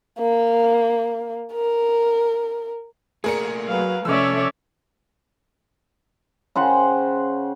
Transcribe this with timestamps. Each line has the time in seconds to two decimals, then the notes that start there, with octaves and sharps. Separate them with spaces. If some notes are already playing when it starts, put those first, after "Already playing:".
0.19 A#3
1.53 A#4
3.24 A3 A#3 G#4 A#4 D5 C#7
3.68 F#3 B4 F5
4.05 C3 F3 A3 C#4 C#5 D5 E5 E6
6.55 C#3 C5 F#5 G5